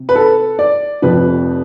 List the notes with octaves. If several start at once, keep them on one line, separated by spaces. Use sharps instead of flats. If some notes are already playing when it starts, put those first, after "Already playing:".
Already playing: C3
B4
A4
D5
F1 F2 C3 F3 B4